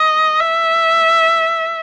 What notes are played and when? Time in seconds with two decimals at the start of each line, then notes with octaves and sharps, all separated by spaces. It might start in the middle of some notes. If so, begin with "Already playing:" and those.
Already playing: D#5
0.40 E5